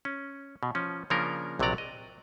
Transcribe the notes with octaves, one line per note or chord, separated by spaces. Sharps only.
C#4
B2
F3 C#4
C#3 F3 A#3 C#4 D4 A#4
A#1 C3 F#3 C#5 D5 A#5
D#5